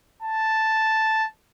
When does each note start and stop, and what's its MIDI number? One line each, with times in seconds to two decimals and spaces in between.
0.23 1.26 81